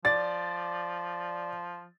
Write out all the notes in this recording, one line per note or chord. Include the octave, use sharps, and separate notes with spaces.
F3 D5 A6